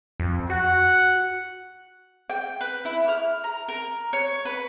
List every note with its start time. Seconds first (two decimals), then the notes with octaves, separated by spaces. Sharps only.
0.20 F2
0.50 F#4 F#5
2.30 G5
2.61 B4
2.85 E4
3.08 F6
3.44 A#5
3.68 A#4
4.13 C#5
4.45 B4